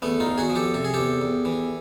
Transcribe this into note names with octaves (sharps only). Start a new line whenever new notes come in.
E2 A3 B3
D#4 F4
E2
F#4 G#4
F3
G4 A4
C3 A4
G#4
E2 G4 A4
E2
E3